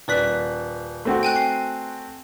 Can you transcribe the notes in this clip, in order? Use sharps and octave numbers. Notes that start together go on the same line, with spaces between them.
D#1 B4 D5 F#6 B6
A3 C4 F#4
G5 G#5 F#6
C7